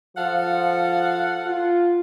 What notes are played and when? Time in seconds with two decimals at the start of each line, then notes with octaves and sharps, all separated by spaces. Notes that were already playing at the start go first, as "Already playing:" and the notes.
0.17 F3 A4 F5 F#5
1.46 F4